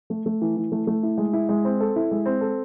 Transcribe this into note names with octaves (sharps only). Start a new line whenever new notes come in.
A3
A3
E3
E3
A3
A3
E4
G#3
E4
G#3
C4
A4
E4
G#3
C4
A4